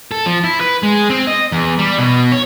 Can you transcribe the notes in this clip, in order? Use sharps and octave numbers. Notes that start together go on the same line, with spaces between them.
A4
F3
E4
B4
G#3
C4
D#5
E2
G3
B2
C#5